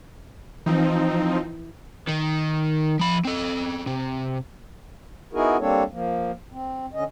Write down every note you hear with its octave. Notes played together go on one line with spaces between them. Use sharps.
E3 F3 C4 D#4
D#3
F3 B5
C4 A4
C3
B3 D#4 E4 F#4 G#4 A#4
G3 A#3 C4 D4 A4 C#5
F3 A#3
C4
D3 C#4 D#5